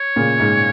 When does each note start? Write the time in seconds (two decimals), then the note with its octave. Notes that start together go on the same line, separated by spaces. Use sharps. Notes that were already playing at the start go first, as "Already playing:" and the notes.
Already playing: C#5
0.16 A#2 C#3
0.40 G#2